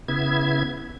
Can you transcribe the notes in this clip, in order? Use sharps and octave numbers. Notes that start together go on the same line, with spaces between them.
C#3 B3 E4 G#6